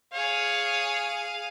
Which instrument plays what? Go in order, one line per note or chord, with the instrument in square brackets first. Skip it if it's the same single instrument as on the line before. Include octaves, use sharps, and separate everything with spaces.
[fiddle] G#4 F5 [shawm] C#5